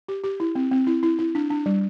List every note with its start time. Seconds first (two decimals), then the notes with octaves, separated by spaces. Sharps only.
0.08 G4
0.24 G4
0.40 E4
0.55 C4
0.71 C4
0.87 E4
1.03 E4
1.19 E4
1.35 D4
1.50 D4
1.66 G3